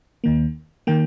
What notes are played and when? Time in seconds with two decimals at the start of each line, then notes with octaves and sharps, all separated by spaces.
0.24 D#2 D#3 A#3
0.87 D#3 A#3 G5